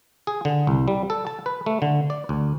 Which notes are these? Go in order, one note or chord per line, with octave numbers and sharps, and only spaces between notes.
G#4
D3
C2
G3
A4
A5
B4
A3
D3
D5
D2